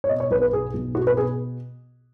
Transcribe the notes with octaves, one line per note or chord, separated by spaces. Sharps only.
C#5
B2 D#5
C#5
B1 B4
B4
B2 G#4
B1
B2 F#4
B4
B2 G#4